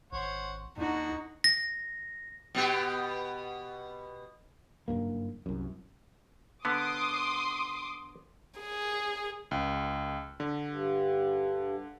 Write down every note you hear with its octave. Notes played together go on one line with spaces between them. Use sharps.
G#1 C5 C#5 F#5
D#2 D3 D#4 F#4
A#6
B2 B3 G4
F#1 G2 A#3
C2 F#2
D3 B3 C6 D6 D#6
G#4
C#2
D3
G2